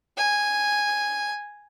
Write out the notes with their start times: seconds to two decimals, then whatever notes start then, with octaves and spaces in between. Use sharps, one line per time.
0.18 G#5